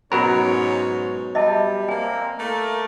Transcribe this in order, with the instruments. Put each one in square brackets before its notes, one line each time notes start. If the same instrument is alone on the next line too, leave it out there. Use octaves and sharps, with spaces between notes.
[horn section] G#2 C#4 C#5 [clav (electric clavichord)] B2 F#3 A#4 [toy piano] B5
[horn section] G3 [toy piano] D#5 E5 A5
[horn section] A#3 C4 [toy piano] G#5
[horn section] A3 A#3 A#4